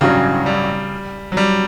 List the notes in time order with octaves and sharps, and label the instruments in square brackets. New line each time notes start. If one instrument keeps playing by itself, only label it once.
[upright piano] A1 G2 F#3 C#4 F#4 [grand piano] C#3
[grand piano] G3
F#3
G3